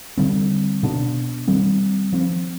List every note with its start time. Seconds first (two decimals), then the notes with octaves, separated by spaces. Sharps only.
0.18 D3 G3 C4
0.83 B2 B3 D4
1.48 D#3 G3 C4
2.13 F3 C4